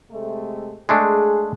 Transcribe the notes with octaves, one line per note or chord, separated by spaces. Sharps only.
C3 G#3 A3
G#3 A3 D4 G#4